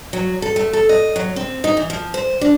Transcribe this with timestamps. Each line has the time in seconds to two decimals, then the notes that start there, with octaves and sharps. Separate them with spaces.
0.13 F#3
0.42 A4
0.56 A3
0.73 A4
0.89 D#5
1.16 F#3
1.36 C4
1.64 D#4
1.77 E3
1.90 F3
2.14 C5
2.41 D4